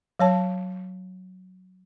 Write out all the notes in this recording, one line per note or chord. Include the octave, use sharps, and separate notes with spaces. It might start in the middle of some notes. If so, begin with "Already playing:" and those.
F#3 C#5 A5